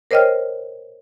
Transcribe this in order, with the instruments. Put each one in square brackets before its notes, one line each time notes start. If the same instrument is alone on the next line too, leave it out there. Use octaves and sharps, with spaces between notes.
[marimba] A#4 C5 C#5 D#5 G5 F6